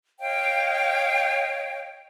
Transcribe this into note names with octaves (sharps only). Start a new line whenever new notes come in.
C#5 D#5 F5 G5